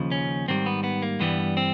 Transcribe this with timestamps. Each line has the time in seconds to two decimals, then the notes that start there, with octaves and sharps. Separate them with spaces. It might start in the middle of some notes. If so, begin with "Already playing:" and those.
Already playing: D#2 C#3 F3
0.12 C#4
0.48 G#2 D#3 G3 C4
0.66 B3
0.84 B3
1.02 A#3
1.20 G2 E3 G3 B3
1.57 C4